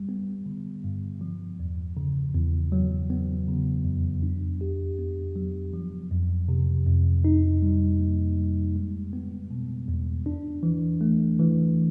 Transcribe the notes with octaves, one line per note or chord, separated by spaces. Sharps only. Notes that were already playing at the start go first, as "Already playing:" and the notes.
Already playing: G3
B3
D3
G2
F3
E2
C#3
E2
F#3
B3
C#3
F2
D4
G4
B3
F#3
F3
F2
C3
F2
D#4
G3
A#3
G3
G#3
B3
B2
E2
D4
E3
A3
E3